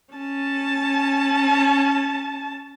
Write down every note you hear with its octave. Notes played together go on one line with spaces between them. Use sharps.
C#4 A5